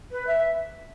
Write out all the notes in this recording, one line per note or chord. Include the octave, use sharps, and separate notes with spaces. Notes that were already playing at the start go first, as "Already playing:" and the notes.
B4
E5